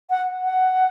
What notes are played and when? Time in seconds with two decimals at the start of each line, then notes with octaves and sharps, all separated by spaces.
0.10 F#5
0.42 F#5